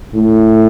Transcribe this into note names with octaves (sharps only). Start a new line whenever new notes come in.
A2